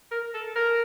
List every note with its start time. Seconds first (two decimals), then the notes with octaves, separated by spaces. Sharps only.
0.11 A#4
0.34 A4
0.56 A#4